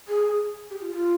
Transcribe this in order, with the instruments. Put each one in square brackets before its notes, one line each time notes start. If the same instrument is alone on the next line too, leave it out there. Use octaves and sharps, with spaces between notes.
[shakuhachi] G#4
G4
F4
F4